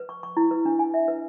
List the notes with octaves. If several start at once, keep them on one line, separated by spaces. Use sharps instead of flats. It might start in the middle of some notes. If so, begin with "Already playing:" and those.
Already playing: B4
C#6
C#6
E4
B4
D4
G#5
E5
B4